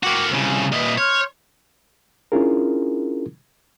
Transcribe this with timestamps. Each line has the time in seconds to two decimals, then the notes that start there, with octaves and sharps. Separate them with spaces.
0.03 A#3 F#4 F5 G5 D6
0.32 C2 C#3 G#5
0.73 A#2 B4 D#5 E5
0.98 C#5 C6 F6 G6
2.32 C#4 D4 E4 F4 G#4 A#4